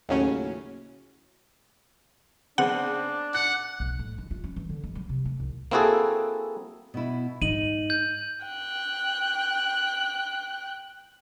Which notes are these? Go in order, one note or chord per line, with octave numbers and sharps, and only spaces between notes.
D#2 A2 C#3 F#3 C#4
C#3 B3 C4 D4 F#5
F#5 F#6
B1
A2
D#3
F4
C#4
E3
D3
G1
F#3
C3
A3
C2
A#3 C4 E4 F#4 G#4 A4
B2 E4
G#2 D#4 D#7 F#7
G6
G5 F#6